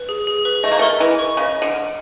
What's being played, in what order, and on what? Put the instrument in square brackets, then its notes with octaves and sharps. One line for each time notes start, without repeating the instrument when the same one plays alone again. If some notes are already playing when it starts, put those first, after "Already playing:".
Already playing: [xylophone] B4
G#4
G#4
B4
[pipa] A3 [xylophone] D#5
[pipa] A#3
A3
[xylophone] A#4
[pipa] E3 [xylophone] D#5
[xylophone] C#6
[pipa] C#3 [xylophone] D#5
[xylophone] D#5
[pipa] D3
[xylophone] F6